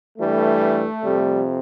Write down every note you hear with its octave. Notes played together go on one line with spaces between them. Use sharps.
G2 E3 G3 A3
F2 C3 G3